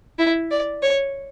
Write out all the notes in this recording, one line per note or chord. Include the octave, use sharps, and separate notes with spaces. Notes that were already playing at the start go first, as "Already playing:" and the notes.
E4
D5
C#5